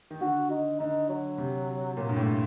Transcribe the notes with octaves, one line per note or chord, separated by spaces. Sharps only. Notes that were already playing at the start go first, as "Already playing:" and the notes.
D#3
D3 F#4
D#4
D3 D#4
F#3
C3
A#2
G2
A2